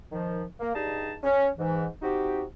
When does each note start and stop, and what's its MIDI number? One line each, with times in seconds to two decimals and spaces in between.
0.11 0.42 51
0.11 0.42 53
0.59 0.72 58
0.74 1.13 43
0.74 1.13 55
0.74 1.13 63
0.74 1.13 68
0.74 1.13 75
0.74 1.13 81
1.23 1.48 61
1.57 1.86 44
1.57 1.86 52
2.02 2.43 60
2.02 2.43 63
2.02 2.43 66
2.02 2.43 67